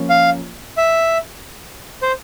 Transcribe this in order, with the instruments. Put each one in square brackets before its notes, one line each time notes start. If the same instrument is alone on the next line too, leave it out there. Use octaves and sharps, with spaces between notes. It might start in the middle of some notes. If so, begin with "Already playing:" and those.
Already playing: [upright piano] F3 A#3 C#4
[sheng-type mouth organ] F5
E5
C5